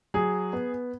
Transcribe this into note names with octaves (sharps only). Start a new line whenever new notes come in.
F#3 G#4
B3